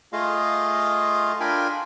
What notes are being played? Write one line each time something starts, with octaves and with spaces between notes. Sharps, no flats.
A3 F4 G#4 D#5 F5
D4 F4 A#4 G5 G#5 B5